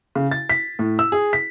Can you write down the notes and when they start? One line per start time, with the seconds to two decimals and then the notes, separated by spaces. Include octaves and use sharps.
0.15 C#3
0.31 A6
0.50 B6
0.79 A2
0.99 E6
1.12 G#4
1.33 B6